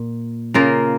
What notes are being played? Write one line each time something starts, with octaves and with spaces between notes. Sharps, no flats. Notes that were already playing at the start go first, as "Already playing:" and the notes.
Already playing: A#2
C#3 A#3 F4 A#4